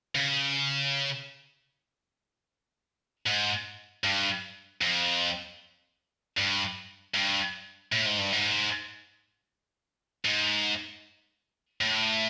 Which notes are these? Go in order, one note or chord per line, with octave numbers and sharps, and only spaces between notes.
C#3
G#2
G2
F2
G2
G2
A2
G#2
G2
G#2
G#2
A2